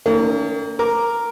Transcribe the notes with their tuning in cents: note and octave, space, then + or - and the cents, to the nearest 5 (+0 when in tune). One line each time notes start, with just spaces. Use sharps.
D#3 +20 A#3 -40 C#4 +40
A#4 +0 D6 +0